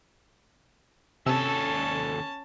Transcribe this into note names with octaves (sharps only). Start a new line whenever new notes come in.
D#2 C3 C#4 A4 A5 E6